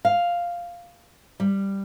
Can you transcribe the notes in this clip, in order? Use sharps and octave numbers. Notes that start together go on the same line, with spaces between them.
F5
G3